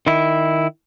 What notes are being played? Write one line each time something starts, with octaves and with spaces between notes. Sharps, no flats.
D#3 E4